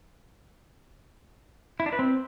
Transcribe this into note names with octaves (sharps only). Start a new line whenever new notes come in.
E4
D4
B4
C4